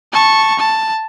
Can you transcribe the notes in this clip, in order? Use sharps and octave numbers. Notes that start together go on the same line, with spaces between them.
A5 C#6
A5